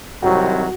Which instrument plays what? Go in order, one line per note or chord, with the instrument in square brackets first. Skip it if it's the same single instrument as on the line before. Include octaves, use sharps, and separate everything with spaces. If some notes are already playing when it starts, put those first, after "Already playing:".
[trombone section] C2 C3 D#3 F#3 [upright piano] F#4